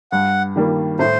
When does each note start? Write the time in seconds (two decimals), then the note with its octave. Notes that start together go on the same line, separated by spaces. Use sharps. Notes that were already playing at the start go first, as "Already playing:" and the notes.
0.12 G2 F#5
0.56 D#3 G3 A#3
0.99 A2 C5